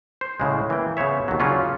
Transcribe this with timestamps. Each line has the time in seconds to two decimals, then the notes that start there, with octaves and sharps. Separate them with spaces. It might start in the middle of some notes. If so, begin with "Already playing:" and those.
0.21 C5
0.40 A2 C#3 G#3
0.70 E3 A#3 G5
0.97 C#3 B3 C5 C#5 E5
1.28 D#2 F#3
1.40 C#3 F#3 C#4 D4 F4